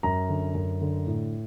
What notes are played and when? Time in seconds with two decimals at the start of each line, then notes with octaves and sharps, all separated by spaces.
0.03 F#2 A#5
0.29 D3
0.55 F#2
0.81 D3
1.07 A2